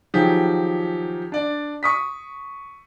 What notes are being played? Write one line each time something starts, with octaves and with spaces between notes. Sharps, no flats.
D#3 F3 F#3 G4 G#4
D4 D5
C#6 D#6 B6